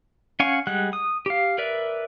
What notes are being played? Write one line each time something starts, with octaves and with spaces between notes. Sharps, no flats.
C#4 F5 F#5 G#5 C#6
G3 G#3 F#5 F#6
D#6
G4 F5
A#4 B4 D5 E5